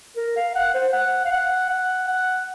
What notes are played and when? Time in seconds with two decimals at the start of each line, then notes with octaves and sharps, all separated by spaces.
0.17 A#4
0.36 F5
0.55 F#5
0.74 C5
0.93 F#5
1.25 F5
1.31 F#5
1.69 F#5
2.08 F#5